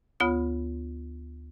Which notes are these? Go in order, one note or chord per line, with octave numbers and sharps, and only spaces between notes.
D2 B3 F4 C#5 B5 D#6